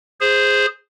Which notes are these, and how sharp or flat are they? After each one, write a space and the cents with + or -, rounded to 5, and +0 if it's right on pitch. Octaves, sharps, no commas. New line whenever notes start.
G#4 -5 C5 +0